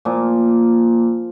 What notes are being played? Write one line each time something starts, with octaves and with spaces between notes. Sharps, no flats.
A#2 F3 A#3